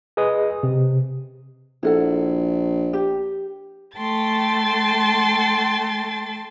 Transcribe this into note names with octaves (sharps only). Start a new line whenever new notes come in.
G#4 B4 D#5 D#6
C3
A#1 E4 A4 F#5
G4
A3 G5 A5 C6 A6